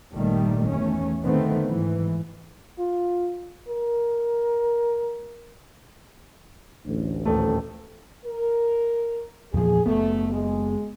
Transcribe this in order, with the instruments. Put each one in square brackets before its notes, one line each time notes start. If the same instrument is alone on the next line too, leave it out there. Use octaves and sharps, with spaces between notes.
[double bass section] G1 A#2 D#3 G3 A3
E2 A3 C#4
D3 D#3 A3 B3 C4
G#2 E3
[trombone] F4
A#4
[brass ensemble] A1 D2
[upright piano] D#1 A3
[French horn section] A#4
[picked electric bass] E2 A#2 F3 [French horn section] G#4
[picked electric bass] F#1 E2 B3 [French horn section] A3
[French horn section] G#3